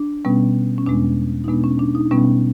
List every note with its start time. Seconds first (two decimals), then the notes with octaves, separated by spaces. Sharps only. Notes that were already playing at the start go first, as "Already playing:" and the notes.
Already playing: D4
0.25 B2 G3 B3 C#4
0.78 C#4
0.86 E2 B2 G#3 B3 D4
1.44 D#4
1.48 B2 G#3 B3 D4
1.64 C#4
1.79 D4
1.95 D#4
2.11 B2 G3 B3 C#4